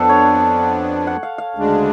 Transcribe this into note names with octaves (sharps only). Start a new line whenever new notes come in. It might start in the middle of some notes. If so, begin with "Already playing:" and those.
Already playing: F2 F3 B3 D4 A4
C#5
F#5
F5
F5
D2 C#3 G#3 D4